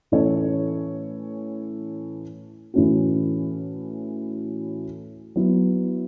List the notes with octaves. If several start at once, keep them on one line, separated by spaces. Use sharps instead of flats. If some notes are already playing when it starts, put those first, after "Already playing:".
A2 E3 C#4 A4 C#5
A2 E3 A3 C#4 F#4
F#3 B3 E4